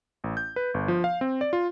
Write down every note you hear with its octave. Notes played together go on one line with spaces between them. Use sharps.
A1
G6
B4
G1
F3
F5
C4
D5
F4